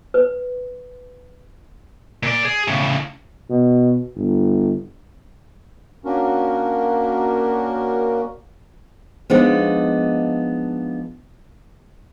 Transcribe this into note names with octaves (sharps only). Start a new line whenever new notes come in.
B4
A#2 D5
G#4
A2 C#3
B2
G1
A#3 C#4 D4 F#4 A#4
F3 G#3 B3 D4 D#4